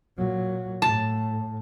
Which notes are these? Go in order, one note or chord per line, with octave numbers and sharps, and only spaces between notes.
A#2 F#3
A2 A5